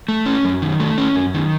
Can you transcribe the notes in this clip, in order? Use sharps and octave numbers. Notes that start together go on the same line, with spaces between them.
A3
C#4
F#2
D#3
A3
C#4
F#2
D#3